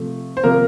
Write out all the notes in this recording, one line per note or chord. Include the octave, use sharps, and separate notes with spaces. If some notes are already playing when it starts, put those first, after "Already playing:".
Already playing: C3 F3 A3
C5
C3 F3 A#3 A#4